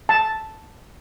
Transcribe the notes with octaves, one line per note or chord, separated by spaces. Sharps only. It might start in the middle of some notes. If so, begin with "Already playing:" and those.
A5